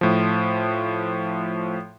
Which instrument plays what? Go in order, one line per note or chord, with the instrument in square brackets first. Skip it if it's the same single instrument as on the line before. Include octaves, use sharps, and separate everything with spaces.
[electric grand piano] A2 F3